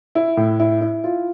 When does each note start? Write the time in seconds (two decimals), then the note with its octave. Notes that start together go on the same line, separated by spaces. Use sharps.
0.15 E4
0.37 A2
0.60 E4
0.81 E4
1.04 F4